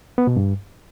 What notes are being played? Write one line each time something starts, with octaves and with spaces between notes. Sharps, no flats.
B3
B2
G2